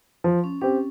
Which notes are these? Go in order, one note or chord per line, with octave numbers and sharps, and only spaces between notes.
F3
C#4
C4 C#4 G4